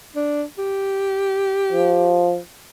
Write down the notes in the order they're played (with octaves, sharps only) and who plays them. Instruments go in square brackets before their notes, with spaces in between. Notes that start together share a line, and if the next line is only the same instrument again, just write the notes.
[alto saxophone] D4
G4
[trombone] F3